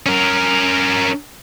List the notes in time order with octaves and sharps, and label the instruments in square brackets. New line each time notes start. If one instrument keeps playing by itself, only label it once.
[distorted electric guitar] C#4 A#4